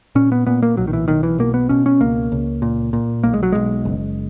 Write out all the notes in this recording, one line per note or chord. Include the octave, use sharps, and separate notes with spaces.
A#2 C#4
B3
A#2 B3
A#3
B1 F#3
D#3
E3
B1 D#3
E3
B2 A#3
B3
B2 C#4
C#4
C#2 A#3
C#2
A#2
A#2
B1 A#3
G#3
F#3
B1 G#3
F#1